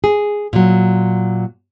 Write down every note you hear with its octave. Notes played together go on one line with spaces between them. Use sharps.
G#4
A#2 F#3